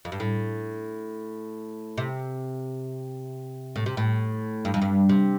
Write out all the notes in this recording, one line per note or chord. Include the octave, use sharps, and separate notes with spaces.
F2
G2
A2
C3
A2
C3
A2
G2
F2
G2
C3